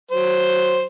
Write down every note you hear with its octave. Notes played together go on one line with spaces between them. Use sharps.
F#3 C5